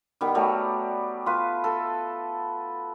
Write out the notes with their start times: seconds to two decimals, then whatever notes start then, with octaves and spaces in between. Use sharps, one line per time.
0.21 D#3 G3 B3
0.35 F#3 G3 A3
1.26 F4 B4
1.64 A4